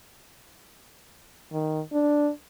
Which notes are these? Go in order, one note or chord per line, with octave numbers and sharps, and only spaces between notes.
D#3
D4